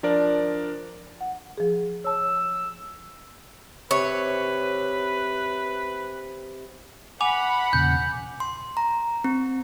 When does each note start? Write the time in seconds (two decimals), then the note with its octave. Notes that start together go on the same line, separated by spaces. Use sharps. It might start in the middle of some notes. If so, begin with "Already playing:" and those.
0.03 F3 D4 A#4 D5
1.21 F#5
1.57 F3 G#4
2.04 C#5 A5 E6
3.91 C3 B4 C#5
7.21 F#5 G#5 B5 D6 F7
7.73 E2 A#2 C#3 G6
8.40 C6
8.77 A#5
9.24 C4